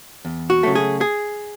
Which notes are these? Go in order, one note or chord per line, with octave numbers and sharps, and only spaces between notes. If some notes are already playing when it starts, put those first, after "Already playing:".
E2
F#4
C#3 F#3 A3
G#4
G#4